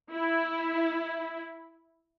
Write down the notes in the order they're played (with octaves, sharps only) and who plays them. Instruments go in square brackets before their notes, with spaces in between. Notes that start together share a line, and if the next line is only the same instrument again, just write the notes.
[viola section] E4